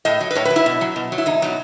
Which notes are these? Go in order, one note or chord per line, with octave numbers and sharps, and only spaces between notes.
A2 D#5
F#3
B4
A2 C#5
F#3 B4
E4
B2
F#3
B2
F#3
E4
E2 D#4
B2 F#3